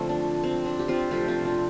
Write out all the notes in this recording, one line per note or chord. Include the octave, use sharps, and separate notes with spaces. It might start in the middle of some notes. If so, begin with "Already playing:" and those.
Already playing: D3 F3 A3 C4 F4
D4
C4
D4
G4
C4 F4
C3 F3 A3 D4 G4
C4 F4
D4 G4